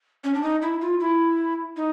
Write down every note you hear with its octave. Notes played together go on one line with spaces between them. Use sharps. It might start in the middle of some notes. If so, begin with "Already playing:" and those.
C#4
D4
D#4
E4
F4
E4
D#4